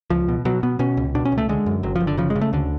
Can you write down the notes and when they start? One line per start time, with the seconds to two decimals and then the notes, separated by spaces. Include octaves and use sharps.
0.10 C#2 F3
0.28 B2
0.45 B2 F#3
0.63 B2 B3
0.79 B2 C#4
0.97 C#2
1.15 B2 D4
1.25 C#4
1.32 C#2
1.38 A3
1.49 D3 G#3
1.66 F#2
1.83 F#1 F#3
1.96 F3
2.00 F#1
2.07 D3
2.18 C#3 F3
2.30 G#3
2.36 C#3
2.41 A3
2.53 D2 D3